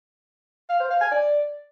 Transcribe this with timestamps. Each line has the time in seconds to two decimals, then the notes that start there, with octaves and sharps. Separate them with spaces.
0.70 F5
0.80 C5
0.90 F5
1.01 G#5
1.11 D5